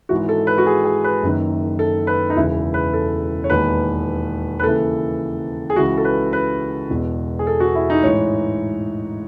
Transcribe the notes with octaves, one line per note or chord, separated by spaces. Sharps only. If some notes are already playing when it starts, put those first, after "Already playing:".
G#1 G#2 E3 F#4
A4
B4
F#4
G#4
G#4
B4
F#1 F#2 D#3
A4
B4
D#4
E1 E2 C#3 E3 E4
B4
A4
C#5
E1 D#2 D#3 B4
B4
D#2 C#3 E3 A4
G#4
C#2 C#3 E3 F#4
A4
B4
B4
E1 E2 B2
G#4
A4
F#4
E4
D#4
A1 G#2 E3 C#5